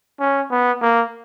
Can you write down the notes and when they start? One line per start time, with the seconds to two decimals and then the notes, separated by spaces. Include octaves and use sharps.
0.20 C#4
0.51 B3
0.81 A#3